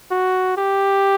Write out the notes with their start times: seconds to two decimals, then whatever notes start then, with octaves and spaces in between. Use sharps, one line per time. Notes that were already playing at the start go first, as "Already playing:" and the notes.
0.11 F#4
0.57 G4